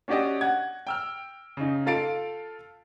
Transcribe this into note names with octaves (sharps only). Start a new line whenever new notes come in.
C#4 D4 F#4 G4 D5 D#5
F#5 G#6
G5 E6 F6
C#3 D#4
F4 A4 F5 A6 C7 D7